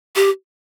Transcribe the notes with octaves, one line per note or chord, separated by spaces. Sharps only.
G4